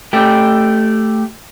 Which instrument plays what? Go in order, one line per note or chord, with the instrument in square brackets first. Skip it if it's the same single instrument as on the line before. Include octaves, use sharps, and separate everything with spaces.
[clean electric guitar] A3 G4